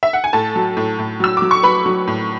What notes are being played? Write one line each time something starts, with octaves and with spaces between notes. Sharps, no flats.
E5
F#5
G#5
A2 A4 A5
F#3
A2
A2
F#3 E6
F#3 D6
C#6
F#3 B4 B5
F#3
A2